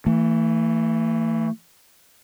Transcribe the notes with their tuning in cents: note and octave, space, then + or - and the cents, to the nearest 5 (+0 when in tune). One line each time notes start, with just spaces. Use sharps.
E3 +0 A3 +35